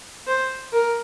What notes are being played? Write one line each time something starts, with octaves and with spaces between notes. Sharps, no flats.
C5
A#4